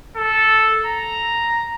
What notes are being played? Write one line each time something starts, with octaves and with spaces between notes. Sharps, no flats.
A4
A#5